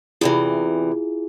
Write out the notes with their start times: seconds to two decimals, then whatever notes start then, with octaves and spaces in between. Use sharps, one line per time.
0.21 E2 C3 E3 E4 F4 G#4